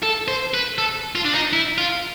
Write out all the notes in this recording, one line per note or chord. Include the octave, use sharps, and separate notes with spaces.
A4
C5
B4
A4
F4
D4
D#4
E4
F4